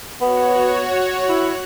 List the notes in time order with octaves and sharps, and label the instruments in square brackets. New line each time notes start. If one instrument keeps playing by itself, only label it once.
[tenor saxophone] B3 [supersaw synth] F#4 C#5
[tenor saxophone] E4 [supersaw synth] F#6